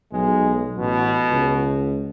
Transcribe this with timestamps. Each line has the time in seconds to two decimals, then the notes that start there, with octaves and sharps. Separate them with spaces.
0.12 B1 G#3
0.77 A1 B2
1.30 C#2